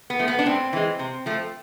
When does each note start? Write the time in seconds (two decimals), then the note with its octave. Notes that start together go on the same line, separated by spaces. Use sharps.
0.10 B3
0.19 F3 A3
0.28 B3
0.39 D4
0.46 A2 C4
0.73 E3 G#3
0.99 C3
1.26 F3 A3